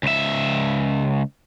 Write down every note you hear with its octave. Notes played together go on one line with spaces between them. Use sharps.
C#2 E5